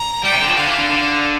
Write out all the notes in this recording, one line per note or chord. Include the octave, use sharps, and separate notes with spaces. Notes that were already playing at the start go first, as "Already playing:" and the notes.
Already playing: A#5
G3 G5
C3
D3
F3
D3 F5
E3
D3
D3